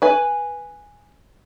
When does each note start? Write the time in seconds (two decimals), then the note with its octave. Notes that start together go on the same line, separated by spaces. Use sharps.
0.02 B4 G#5